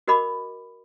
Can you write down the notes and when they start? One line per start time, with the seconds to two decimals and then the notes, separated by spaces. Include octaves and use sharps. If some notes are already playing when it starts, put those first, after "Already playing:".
0.08 F#4 A#4 D#5 B5 D6